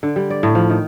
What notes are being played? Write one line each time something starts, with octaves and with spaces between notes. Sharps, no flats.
D3
G3
D5
A2
F3
D#3